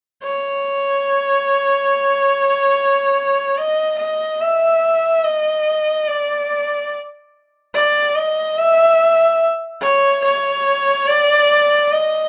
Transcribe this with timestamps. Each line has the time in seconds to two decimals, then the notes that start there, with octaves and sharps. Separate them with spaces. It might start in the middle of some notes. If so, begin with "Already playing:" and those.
0.23 C#5
3.57 D#5
3.99 D#5
4.41 E5
5.23 D#5
6.07 D5
7.74 D5
8.15 D#5
8.58 E5
9.82 C#5
10.24 C#5
11.07 D5
11.91 D#5